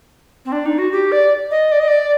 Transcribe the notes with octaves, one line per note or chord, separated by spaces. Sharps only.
C4
D4
D#4
F#4
G4
D5
D#5
D5
D#5
D5